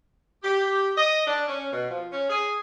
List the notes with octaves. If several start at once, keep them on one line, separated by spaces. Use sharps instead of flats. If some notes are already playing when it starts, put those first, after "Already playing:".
G4
D#5
D4
C#4
B2
F3
C#4
G#4